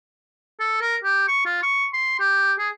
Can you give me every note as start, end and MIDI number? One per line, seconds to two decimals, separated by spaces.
0.60 0.79 69
0.81 0.96 70
1.04 1.27 67
1.28 1.42 85
1.46 1.61 65
1.63 1.87 85
1.93 2.17 84
2.19 2.52 67
2.58 2.69 68